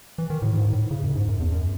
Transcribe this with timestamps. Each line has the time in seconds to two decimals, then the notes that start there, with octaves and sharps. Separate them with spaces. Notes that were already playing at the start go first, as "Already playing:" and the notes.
0.18 E3
0.30 D#3
0.42 A2
0.54 G#2
0.73 A2
0.91 C#3
1.03 F#2
1.15 G#2
1.28 F#2
1.40 E2
1.52 F#2